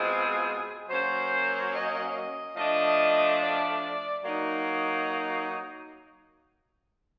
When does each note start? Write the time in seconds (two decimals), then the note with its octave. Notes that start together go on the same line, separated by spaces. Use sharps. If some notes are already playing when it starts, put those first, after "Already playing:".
Already playing: B2 G#3 C4 F4 G#4
0.88 F#3 A#3 C#4 C5
1.73 D#5
2.15 D#5
2.56 F3 A3 D4 D#5
3.40 D5
4.23 F#3 A#3 D#4